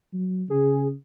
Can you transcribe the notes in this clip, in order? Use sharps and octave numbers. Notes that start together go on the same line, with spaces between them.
F#3
C#3 G#4